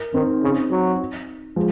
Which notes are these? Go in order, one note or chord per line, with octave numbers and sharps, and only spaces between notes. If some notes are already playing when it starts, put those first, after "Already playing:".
Already playing: A#4
D#3 C4 D#4
C#3
F#3
F3 G#3